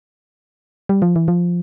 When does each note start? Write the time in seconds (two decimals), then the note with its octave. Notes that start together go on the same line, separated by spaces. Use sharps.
0.89 G3
1.02 F3
1.16 E3
1.28 F3